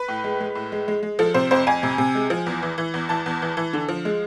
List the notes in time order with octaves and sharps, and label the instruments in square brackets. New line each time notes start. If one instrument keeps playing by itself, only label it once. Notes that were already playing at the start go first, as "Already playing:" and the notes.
Already playing: [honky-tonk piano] B4
A2
G#3
G#3
A2
G#3
G#3
G#3
F3 A4
C3 C5
F2 C5
F2 G#5
C3
C3
G#3
F3
E2
E3
E3
E2
E3 A5
E2
E3
E3
D3
F3
G#3